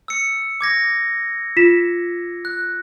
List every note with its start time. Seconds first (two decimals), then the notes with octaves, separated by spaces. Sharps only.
0.08 E6 C#7
0.61 D6 G#6 A#6
1.56 F4 B6 E7
2.45 F#6